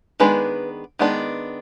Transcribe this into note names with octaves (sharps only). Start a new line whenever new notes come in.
D#3 G#3 B3 D4 B4
D#3 G#3 B3 D4